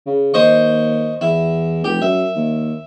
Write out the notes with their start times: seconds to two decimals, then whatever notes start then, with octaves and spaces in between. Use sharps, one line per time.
0.06 C#3
0.34 D#2 C5 D#5 C#6
1.21 E2 E4
1.84 F1 G4
2.02 F#2 E5
2.35 D#2